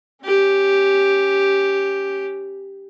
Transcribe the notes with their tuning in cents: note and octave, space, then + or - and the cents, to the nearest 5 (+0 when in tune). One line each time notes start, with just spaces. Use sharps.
C#4 +0 G4 +0